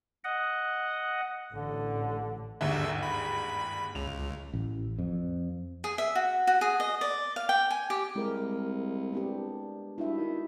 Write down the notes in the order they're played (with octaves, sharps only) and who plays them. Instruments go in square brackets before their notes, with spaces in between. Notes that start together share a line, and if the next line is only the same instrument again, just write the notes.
[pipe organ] D#5 F#5
[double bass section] A1 [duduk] D3
[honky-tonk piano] G1 D#2 G#2 [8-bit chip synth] D3 E5
[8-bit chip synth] B5
[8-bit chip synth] C#2 [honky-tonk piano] F7
[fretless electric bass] A1
F2
[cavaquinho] G#4
E5
F#4
F#4
G#4
D#5
D5
F5
G5
G#5
G4
[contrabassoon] C2 [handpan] G#3 A#4
[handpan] B3 D4 G4
[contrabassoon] G2 [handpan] E4 F#4 E5
[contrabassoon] D#3